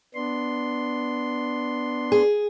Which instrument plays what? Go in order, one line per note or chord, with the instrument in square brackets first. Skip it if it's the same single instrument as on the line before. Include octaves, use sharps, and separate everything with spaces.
[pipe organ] B3 D4 C6
[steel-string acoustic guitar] G#4